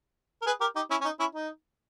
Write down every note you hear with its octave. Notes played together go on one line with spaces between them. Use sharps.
A#4
G#4 B4
G4 A#4
D#4 G4
C#4 E4
C#4
D#4
C#4 E4
D#4